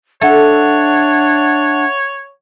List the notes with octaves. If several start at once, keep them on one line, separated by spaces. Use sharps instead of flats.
D4 A4 C#5 E5 F#5